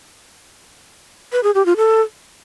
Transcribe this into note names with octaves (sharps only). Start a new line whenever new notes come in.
B4
G#4
G4
F4
A4